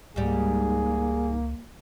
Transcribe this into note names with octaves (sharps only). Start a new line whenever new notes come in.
C#2 G#2 G3 A#3 G#4